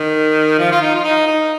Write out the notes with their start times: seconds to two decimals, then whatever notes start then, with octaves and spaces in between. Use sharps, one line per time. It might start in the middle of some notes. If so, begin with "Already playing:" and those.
Already playing: D#3
0.59 F3
0.72 F4
0.82 D#4
0.95 F4
1.04 D#4
1.27 D#4